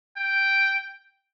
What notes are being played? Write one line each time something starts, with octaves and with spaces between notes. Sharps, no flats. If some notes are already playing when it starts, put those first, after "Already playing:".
G5